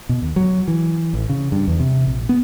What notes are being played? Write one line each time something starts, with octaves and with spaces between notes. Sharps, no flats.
B2
D#2
F#3
E3
A1
C#3
G2
E2
C3
A#1
B3